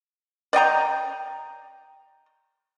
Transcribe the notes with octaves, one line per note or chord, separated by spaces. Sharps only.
D5 D#5 G5 A#5